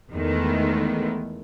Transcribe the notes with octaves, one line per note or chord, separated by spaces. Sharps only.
E2 D#3 G#3 A3 B3